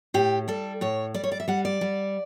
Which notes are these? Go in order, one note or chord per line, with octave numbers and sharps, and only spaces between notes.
A2 G4
G3 A4
A2 C#5
G3 D5
C#5
D5
E5
G3 F#5
D5
G3